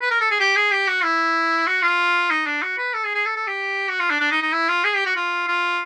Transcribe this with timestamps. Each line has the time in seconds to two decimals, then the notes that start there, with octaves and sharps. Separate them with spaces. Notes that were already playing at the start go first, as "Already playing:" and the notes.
0.01 B4
0.11 A#4
0.21 A4
0.31 G#4
0.40 G4
0.56 G#4
0.71 G4
0.88 F#4
1.04 E4
1.67 F#4
1.82 F4
2.30 D#4
2.46 D4
2.62 F#4
2.78 B4
2.94 A4
3.04 G#4
3.15 G#4
3.26 A4
3.36 A4
3.47 G4
3.89 F#4
4.00 F4
4.10 D4
4.20 D4
4.31 D#4
4.41 D#4
4.53 E4
4.69 F4
4.84 G#4
4.95 G4
5.06 F#4
5.16 F4
5.48 F4